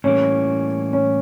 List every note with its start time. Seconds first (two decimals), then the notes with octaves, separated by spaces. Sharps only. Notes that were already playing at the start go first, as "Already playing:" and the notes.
0.04 A2 E3 G3 A#3 C#4
0.93 C#4